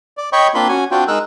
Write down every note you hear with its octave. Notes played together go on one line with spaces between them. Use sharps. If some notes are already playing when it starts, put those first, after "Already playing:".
D5
C#5 D#5 G5 B5 C#6
A#3 C4 D4 F4 B5 C6
C#4 F#4 G#5
C4 D4 F4 F#4 G5
G#3 D#4 A#4 E6 F#6